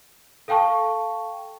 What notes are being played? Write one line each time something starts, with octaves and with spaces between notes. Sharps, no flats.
A4 F5 G5 A5 C#6